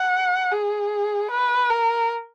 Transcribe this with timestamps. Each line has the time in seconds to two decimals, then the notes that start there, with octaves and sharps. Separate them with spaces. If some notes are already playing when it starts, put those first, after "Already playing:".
Already playing: F#5
0.52 G#4
1.31 B4
1.70 A#4